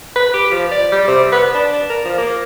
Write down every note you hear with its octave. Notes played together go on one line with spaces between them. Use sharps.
B4
G4
F3
D5
G3
C3
B4
D4
A#4
F3
A#3